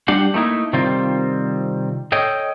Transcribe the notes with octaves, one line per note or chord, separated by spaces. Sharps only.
G3 D4 G4 F#5
A3 A#3 D#4 E4
C3 D#3 G3 C4 F4
A4 C#5 D#5 G5